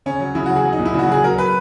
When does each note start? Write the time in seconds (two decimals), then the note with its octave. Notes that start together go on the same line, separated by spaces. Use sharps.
0.06 C#3 C#4
0.20 F#3
0.35 C#3 E4
0.46 F#4
0.50 F#3
0.56 G#4
0.65 F#3
0.73 D#4
0.79 A#2
0.85 E4
0.94 C#3 F#4
1.08 F#3 G#4
1.24 F#3 A#4
1.38 B4